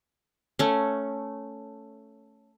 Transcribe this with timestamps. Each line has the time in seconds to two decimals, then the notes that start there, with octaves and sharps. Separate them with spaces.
0.59 A3 C#4